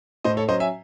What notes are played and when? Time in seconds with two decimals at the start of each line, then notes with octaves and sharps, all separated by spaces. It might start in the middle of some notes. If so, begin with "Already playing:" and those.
0.24 A2 C5 D#5
0.37 A4 C#5
0.48 F#3 C#4 C5 D#5
0.60 E5 G#5